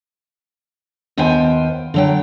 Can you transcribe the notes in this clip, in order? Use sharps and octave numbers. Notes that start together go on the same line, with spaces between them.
D#2 B3 F4 C5 G5 G#5
D3 F#3 G5